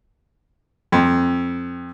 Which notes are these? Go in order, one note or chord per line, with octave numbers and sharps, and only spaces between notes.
F2